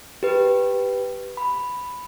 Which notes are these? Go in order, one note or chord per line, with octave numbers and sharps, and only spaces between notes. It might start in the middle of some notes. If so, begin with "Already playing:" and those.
G4 B4
B5